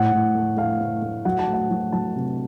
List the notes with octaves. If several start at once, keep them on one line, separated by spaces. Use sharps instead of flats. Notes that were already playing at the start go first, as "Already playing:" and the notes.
Already playing: A2 F#5
A2
A3
A3 F5
A3
A3
F#3 F#5
A5
A3
F#5
F#3
F#3 A5
C3